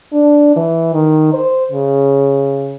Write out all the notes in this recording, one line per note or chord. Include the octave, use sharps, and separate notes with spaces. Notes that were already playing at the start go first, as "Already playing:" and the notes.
D4
E3
D#3
C5
C#3